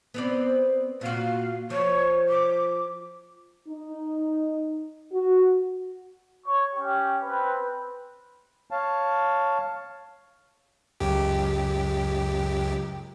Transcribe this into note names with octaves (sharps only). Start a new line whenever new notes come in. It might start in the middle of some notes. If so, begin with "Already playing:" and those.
B3 C4 D5
A#2 F#4 F5
F3 C#5
D6
D#4
F#4
C#5 C#6
C#4 G4
C4 B4
C#5 F5 A5
C#2 F#2 G4